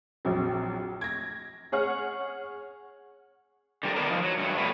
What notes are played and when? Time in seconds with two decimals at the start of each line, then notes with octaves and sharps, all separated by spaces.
0.25 A#1 F2 F#3
1.01 G#6 A#6
1.72 G#4 C#5 F#5 F6
3.83 D3 G3 A#4 D5
3.96 D#3 B3 D4 A#4
4.11 F3 D#4
4.23 F#3
4.38 G2 F#3
4.58 B2 A3 E4 F#4 B4